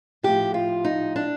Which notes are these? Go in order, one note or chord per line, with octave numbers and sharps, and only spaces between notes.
A2 F3 G4
F4
D#4
D4